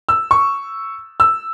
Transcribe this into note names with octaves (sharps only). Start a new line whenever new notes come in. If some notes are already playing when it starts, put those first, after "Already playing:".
E6
C#6
E6